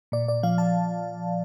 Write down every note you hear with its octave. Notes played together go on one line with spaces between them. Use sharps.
A#2 D5
D5
F3 F5
A5